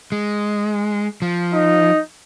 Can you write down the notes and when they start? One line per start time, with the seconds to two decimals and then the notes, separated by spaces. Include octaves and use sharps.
0.12 G#3
1.22 F3
1.53 D#4